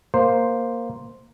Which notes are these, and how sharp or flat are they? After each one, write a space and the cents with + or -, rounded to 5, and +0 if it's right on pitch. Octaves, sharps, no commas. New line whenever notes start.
A#3 +0 C5 +0